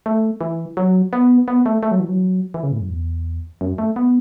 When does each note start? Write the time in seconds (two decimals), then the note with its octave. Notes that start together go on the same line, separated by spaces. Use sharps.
0.06 A3
0.41 E3
0.77 F#3
1.13 B3
1.48 B3
1.66 A3
1.83 A3
1.91 F#3
2.00 E3
2.09 F#3
2.54 E3
2.63 C#3
2.72 A2
2.81 F#2
2.90 E2
3.61 F#2
3.78 A3
3.96 B3